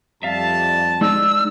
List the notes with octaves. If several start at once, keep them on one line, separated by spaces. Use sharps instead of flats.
F2 G3 E5 F5 A5
G#3 D4 D#4 E6